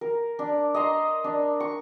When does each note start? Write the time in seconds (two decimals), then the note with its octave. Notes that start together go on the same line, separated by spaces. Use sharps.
0.01 A#4
0.39 D4
0.74 D#5 A#5 C6
1.24 D4
1.60 C#6